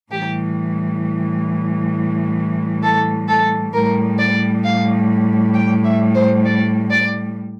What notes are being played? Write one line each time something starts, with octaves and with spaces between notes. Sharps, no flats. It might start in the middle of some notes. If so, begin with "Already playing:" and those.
A2 E3 G3 G4
A4
A4
A2 G3 A#4
D5
F5
G5
E5
C5
D5
D5